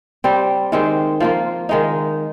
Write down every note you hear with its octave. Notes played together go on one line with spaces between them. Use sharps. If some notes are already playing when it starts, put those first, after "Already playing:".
G3 C4 G4
D#3 G#3 C4 G4
F3 A#3 F4
D#3 G#3 D#4